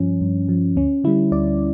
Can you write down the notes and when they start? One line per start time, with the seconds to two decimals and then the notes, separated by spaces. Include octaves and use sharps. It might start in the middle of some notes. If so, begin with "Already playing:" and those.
Already playing: G2 F3 C#4
0.21 G2
0.49 F3
0.76 D2 C#4
1.04 D3 G3 E4
1.32 D2 D5